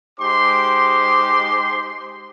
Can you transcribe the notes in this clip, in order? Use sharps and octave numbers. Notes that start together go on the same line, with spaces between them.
G#3 D#4 G4 C5 C6 D6